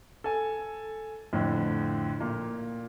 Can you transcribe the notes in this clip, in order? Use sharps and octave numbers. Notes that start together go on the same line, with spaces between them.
A4 G#5
F2 A2 D3
A#2